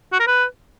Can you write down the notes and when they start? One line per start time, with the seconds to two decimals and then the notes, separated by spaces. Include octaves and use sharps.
0.12 F#4
0.20 A#4
0.27 B4